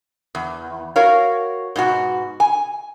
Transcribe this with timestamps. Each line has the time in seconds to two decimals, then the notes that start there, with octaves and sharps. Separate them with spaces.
0.35 E2
0.96 F#4 A#4 C#5 F5
1.76 G#2 B2 F#4
2.40 G#5